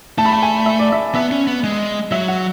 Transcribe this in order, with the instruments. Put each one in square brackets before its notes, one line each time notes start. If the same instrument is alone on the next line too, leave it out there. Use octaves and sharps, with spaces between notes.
[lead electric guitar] A3 [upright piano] A5
[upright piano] B5
A5
G#5
E5
D5
E5
[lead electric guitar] B3 [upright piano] E5
[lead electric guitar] C#4
B3
G#3
[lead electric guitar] F#3 [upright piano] E5
[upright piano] F#5